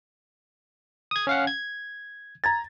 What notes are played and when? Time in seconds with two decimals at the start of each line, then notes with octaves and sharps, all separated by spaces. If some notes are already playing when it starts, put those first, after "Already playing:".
1.11 D#6 G#6
1.27 C#4 F5 F#5
1.47 G#6
2.44 A#5 G#6 A6